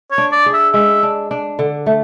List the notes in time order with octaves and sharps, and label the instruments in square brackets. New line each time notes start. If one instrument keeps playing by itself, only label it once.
[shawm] C#5
[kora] D4
[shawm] D5
[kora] G#4
[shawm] E5
[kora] G#3 [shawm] E5
[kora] D4
D4
D3
A3